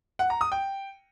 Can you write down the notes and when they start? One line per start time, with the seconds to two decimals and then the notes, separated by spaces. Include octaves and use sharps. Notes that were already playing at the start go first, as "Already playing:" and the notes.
0.19 F#5
0.30 A#5
0.41 D#6
0.52 G5